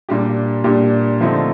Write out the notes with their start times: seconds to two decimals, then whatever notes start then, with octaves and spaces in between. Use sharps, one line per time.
0.09 A#2 G3 D4 G4
0.64 A#2 G3 D4 G4
1.21 D3 F3 A3 C4 D#4